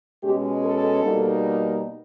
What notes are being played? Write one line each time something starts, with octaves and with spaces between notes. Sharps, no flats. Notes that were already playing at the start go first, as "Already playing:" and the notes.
B2 G#3 C#4 G4
A4
B2 G3 A#3 D#4